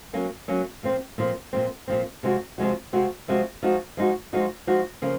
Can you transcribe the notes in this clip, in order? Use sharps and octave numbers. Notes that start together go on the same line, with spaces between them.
F#3 A#3 C#4
F#3 A#3 C#4
A#2 F3 C4
A#2 F3 C4
A#2 F3 C4
A#2 F3 C4
C3 F3 G#3 C4 F#4
C3 F3 G#3 C4 F#4
C3 F3 G#3 C4 F#4
C3 F3 G#3 C4 F#4
F3 G#3 D#4 F#4
F3 G#3 D#4 F#4
F3 G#3 D#4 F#4
F3 G#3 D#4 F#4
C#3 F3 A#3